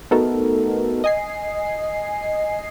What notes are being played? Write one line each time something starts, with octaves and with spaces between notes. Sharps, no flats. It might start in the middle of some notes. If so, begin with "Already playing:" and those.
A3 B3 D#4 F#4 A4 A#4
D#5 G#5 C7